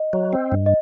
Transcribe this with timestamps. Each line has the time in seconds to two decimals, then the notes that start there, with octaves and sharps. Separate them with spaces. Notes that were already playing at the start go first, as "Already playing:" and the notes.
Already playing: D#5
0.13 F#3
0.33 C4
0.52 G2
0.66 D#5